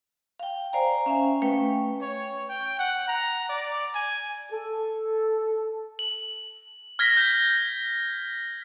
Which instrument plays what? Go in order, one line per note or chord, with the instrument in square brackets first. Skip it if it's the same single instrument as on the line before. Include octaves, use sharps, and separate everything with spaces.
[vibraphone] F5 G5
C5 D5 F5 G#5 A#5
C#4 E5 F5 G#5
A3 C#4 B4 G5
[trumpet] C#5
G5
F#5
A#5
D5
G#5
[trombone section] A4
[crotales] F#7
F6 G#6 A#6 B6
G6